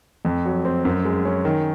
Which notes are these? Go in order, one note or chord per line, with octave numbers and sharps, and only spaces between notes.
F2
F#3
C4
F#2
G#3
C#4
D#3